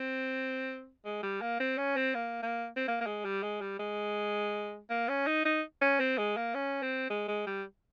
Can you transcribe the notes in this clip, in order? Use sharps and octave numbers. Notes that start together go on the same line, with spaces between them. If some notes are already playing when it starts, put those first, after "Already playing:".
Already playing: C4
G#3
G3
A#3
C4
C#4
C4
A#3
A#3
C4
A#3
A#3
G#3
G3
G#3
G3
G#3
A#3
C#4
D#4
D#4
C#4
C4
G#3
A#3
C#4
C4
G#3
G#3
G3